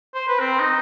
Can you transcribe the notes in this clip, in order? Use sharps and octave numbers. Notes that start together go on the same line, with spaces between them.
C5
B4
C4
D#4